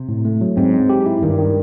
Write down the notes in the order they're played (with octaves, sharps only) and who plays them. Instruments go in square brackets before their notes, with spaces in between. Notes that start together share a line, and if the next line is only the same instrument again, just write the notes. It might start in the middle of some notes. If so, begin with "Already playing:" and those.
Already playing: [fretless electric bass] C3
[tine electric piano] A2
A3
F#3
[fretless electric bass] G#2 [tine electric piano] C4
[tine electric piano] C4
G4
E4
[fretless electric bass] G2 [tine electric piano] D#3
[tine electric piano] D#3